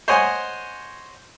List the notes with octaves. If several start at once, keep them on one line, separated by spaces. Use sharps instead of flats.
C5 C#5 D#5 F#5 G#5 C6